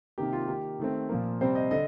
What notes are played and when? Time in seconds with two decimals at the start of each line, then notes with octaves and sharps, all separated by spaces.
0.18 C3 D#3 A#3 G4
0.33 F4
0.48 D#3 A#3 G4
0.79 D#3 A3 C4
1.09 A#2 F3 A#3
1.41 C3 G3 C4 C5
1.55 D#5
1.71 D3 D#5